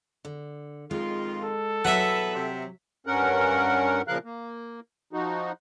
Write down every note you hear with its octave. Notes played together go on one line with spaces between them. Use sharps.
D3
F2 D#3 G#3 F4
A4
E2 B2 F#3 B4 E5 F#5
C3
G2 C#4 A#4 F#5
A#2 C#3 F3 A#4 F5 F#6
A#3
F3 D#4 F#4